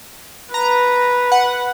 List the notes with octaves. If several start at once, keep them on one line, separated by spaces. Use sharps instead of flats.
B4 A#5
F#5